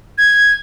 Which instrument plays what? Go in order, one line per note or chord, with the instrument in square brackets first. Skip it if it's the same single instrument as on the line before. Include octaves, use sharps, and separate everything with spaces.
[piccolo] G#6